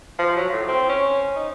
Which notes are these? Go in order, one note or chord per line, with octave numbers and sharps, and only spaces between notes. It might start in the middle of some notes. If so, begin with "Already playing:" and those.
F3
F#3
A2
C4
C#4
D#4